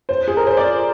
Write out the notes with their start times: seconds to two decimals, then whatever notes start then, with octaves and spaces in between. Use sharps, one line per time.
0.09 C5
0.28 G#4
0.37 A#4
0.47 C5
0.57 D5